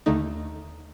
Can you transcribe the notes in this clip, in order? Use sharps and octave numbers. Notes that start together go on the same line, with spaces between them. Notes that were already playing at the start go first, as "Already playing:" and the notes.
D#2 D3 A3 D#4